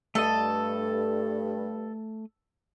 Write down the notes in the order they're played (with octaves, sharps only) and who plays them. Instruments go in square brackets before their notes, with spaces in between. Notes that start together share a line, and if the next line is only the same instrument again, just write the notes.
[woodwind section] G2 [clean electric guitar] A3 D#5 [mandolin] A4